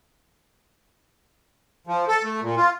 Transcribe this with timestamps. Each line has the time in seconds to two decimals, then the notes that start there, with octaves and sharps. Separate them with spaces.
1.87 F3
2.08 A4
2.23 A3
2.41 A#2
2.56 F4